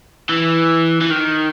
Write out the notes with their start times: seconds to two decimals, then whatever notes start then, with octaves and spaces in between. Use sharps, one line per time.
0.29 E3
1.01 E3
1.10 D#3